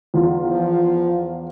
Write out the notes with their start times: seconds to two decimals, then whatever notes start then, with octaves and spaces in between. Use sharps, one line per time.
0.14 E2 F4
0.51 F3